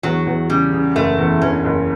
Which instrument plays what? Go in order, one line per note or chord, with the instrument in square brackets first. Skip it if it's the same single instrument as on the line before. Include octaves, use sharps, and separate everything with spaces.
[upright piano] E2 [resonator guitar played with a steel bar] F#3
[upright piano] E2
[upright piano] C#3 [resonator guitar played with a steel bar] G3
[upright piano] C#3
[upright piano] F#1 [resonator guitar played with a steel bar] A3
[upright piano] E2
[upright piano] E2 [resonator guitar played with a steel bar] C#4
[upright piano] F#1